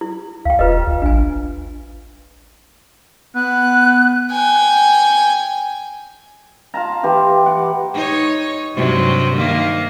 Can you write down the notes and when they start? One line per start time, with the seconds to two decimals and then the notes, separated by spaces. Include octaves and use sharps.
0.01 E4
0.45 D2 F5 G5
0.59 E1 F4 B4 D#5
0.87 D2
1.02 A1 D4 G#5
3.35 B3 F#6
4.32 G5 G#5
6.74 F4 A5 A#5
7.03 E3 G4 C6
7.46 F#5 D6
7.94 D#4 C#5
8.75 G2 C3 F#3
9.35 D#3 A#3